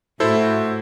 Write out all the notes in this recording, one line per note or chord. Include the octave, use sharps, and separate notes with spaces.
A2 E4 F#4 A4 C5